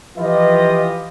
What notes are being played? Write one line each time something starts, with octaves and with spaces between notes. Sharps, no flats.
E3 F3 F4 G4 B4 D#5